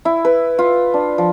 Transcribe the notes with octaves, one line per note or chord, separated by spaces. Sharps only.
E4
B4
F4
D4
F3